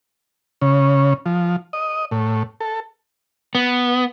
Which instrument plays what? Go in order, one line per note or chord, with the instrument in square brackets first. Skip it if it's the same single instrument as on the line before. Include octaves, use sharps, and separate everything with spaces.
[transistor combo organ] C#3
F3
D#5
A2
A4
[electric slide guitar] B3